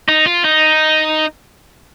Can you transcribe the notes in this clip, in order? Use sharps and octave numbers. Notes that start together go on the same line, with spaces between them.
D#4
F4
D#4